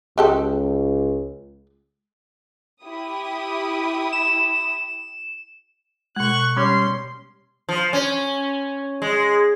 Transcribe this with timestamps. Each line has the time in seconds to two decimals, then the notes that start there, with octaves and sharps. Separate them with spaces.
0.18 C#2 G#3 G4 A4
2.84 E4 G4 D#6
4.13 E7
6.16 B2 G#3 C#6 F#6
6.57 G3 C#4 C#5 C6
7.69 F3
7.93 C#4
9.02 G#3